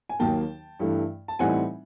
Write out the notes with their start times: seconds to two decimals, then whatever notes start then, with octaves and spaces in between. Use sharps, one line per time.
0.09 G#5
0.19 D#2 D#3 F#3 A#3 G5 A5
0.79 G2 E3 A3
1.28 A5
1.39 A2 E3 G3 C4 D#4 F#5 G#5